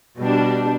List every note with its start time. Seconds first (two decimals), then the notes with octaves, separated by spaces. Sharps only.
0.19 B2 G3 D4